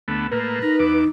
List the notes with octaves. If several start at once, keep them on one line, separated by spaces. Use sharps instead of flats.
D2 A3 B3
A2 A#3 B4
D#4 A#4
E2 D6